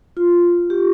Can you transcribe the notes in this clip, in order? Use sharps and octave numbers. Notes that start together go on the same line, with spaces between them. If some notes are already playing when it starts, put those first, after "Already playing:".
F4
G4